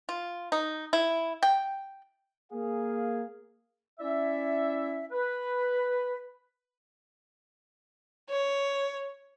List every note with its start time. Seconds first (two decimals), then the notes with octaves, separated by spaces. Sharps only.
0.09 F4
0.52 D#4
0.93 E4
1.43 G5
2.53 A#3 G#4 F5
3.99 C#4 E4 D5 E5
5.12 B4
8.29 C#5